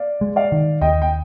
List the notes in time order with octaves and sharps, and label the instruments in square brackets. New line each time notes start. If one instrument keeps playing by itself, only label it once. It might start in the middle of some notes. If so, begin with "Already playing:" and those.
Already playing: [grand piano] D5 F5
[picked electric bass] G#3
[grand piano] D5 F5
[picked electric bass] D#3
[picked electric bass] D#2 [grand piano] D#5 G5
[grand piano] G5